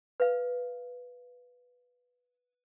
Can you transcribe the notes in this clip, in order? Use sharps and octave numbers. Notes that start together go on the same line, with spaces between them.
B4 F5